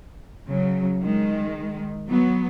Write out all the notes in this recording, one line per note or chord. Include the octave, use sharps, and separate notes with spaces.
C#3 F#3
D#3 G#3
F#3 B3